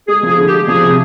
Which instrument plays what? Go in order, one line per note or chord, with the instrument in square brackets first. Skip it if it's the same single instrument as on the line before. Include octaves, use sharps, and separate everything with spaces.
[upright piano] G#3 [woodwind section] G#4
[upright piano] F3 [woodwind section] G#4
[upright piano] D3
[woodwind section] G4
[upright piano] G#3
[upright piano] F3 [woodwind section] G#4
[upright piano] C3